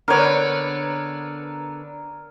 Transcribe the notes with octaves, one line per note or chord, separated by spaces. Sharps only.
D3 B3 A#4 C#5